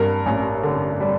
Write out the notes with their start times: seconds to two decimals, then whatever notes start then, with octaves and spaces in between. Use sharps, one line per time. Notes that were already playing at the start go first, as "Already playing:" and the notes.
Already playing: G2 A#4
0.26 A1
0.63 D3
1.00 G3